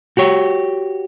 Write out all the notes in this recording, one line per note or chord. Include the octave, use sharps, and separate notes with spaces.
F#4 G4 C#5